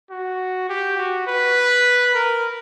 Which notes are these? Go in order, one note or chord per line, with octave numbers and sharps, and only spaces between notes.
F#4
G4
F#4
B4
A#4